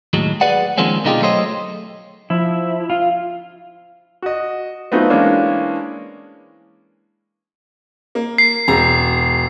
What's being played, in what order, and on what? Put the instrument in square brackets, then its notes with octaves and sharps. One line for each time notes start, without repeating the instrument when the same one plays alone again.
[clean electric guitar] D#2 A2 F#3 G#3
G#4 B4 D5 F#5
D#3 F3 G#3 A#3 C4 C#4
B2 D3 D#4 F4 G4 G#4
F#3 A3 A4 C5 C#5 D#5
[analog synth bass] F3 [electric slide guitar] E4
[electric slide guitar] F4
[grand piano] F#4 D#5
F#3 A3 B3 C4 D#4 F4
E3 G#3 A#3 C#4 D4
[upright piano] A#3
[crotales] C7
[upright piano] E1 A#5